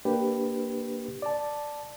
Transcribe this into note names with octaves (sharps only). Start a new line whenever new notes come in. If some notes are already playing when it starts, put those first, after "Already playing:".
A#3 D4 G4 B4
D5 A5